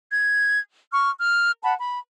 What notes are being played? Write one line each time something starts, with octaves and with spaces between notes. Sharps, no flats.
G#6
C#6 F6
F6
F#5 A5 B5
B5